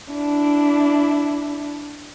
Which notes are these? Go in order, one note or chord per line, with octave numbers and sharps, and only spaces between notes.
D4 E4